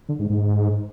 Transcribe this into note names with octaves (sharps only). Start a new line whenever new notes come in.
D3
G#2
G#2